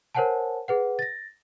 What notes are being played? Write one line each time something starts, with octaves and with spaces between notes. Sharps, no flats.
A#4 C5 C#5 F#5 G#5 A5
G#4 B4 F#5
A6 A#6